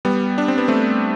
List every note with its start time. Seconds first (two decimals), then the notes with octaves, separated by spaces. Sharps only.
0.05 G3 B3
0.38 D4
0.48 C4
0.58 B3
0.68 A3 C4